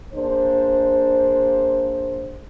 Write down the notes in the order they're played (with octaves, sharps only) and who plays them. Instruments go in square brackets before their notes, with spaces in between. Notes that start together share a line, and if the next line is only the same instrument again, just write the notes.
[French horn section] A#3 D4 G#4 C5